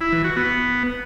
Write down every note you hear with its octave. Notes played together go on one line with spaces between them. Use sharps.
E4
E3
F#4
B3